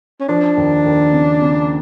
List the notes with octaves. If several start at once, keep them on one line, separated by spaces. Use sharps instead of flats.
C#4
F3 D4
D#2
D#2
C#3
C#3